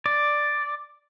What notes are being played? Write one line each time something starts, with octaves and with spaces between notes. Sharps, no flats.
D5